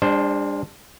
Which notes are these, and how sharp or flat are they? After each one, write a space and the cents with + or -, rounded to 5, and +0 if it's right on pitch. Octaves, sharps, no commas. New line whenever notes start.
G3 +45 D4 +0 C5 +0